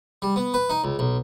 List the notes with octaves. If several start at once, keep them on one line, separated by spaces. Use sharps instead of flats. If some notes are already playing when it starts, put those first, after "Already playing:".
G3
B3
B4
D#4
C#2
B1